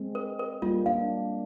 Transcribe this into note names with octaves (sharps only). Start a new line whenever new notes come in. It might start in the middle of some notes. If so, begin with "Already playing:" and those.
Already playing: G#3 C4
A#4
A#4
G3 A#3 F4
A#3 D4 F5